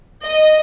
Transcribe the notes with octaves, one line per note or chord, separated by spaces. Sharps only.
D#5